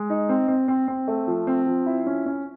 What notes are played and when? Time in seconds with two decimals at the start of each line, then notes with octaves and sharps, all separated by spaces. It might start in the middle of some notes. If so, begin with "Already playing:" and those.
Already playing: G#3
0.10 D#4
0.29 C4
0.48 C4
0.68 C4
0.88 C4
1.08 A3
1.27 F3
1.47 C4
1.67 F3
1.86 E4
2.06 C#4
2.26 C#4